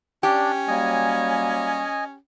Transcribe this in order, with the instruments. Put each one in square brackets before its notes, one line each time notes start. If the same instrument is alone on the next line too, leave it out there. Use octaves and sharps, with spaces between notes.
[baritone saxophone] C#4 [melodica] D4 D5 [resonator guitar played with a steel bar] G4
[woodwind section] F#3 G3 A#3 [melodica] D#5 G#5